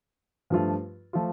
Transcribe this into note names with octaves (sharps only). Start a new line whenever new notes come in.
G2 F3 A3 F4
F3 A3 F4